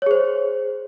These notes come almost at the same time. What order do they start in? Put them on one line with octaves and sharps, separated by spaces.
C#5 G#4 C5